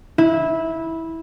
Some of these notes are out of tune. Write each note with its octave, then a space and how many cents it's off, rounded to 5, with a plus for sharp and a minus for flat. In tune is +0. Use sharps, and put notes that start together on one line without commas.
E4 -15